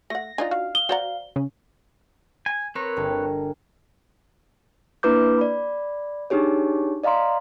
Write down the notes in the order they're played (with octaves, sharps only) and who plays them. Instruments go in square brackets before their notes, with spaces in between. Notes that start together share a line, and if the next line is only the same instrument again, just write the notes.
[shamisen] A3 F#5 [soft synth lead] A#6
[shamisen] D4 D#4 F4 [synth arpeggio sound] G#5
[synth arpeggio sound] F#4 [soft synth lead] F5
[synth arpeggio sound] D#6 [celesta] G7
[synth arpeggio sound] F#4 A#5 [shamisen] C5 D5 F#5
[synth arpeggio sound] C#3 [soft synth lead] C#4
[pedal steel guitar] G#5
[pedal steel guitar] C4 B4 C#5 [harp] A#4
[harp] G1 G2
[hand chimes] A#3 D4 E4 B4 D6 G6
D5 B5
D4 D#4 G4 G#4 C#5
D5 D#5 F5 A#5 C6